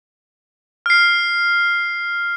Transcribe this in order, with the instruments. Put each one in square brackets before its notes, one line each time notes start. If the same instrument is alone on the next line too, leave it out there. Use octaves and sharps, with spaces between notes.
[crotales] F6 C7